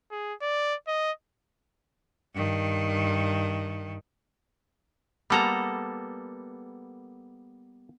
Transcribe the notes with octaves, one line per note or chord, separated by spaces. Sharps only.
G#4
D5
D#5
G2 D#3
G3 A#3 B3 A4 A#5